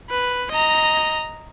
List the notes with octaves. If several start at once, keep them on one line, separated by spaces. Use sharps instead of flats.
B4
D#5 A#5